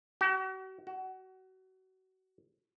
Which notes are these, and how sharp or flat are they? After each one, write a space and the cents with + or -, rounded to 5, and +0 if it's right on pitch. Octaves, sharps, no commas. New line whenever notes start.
F#4 +40
F#4 +25